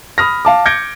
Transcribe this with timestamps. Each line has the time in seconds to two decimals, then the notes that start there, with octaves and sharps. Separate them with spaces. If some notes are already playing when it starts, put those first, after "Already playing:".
0.18 B5 D#6 F6 A#6
0.45 F5 A5 D6
0.65 D6 G6 G#6 A#6 C#7 D7